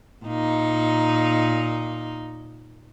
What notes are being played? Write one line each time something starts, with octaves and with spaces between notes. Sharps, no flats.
A#2 D#4